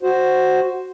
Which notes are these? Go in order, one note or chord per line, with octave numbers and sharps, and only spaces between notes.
F#4 C5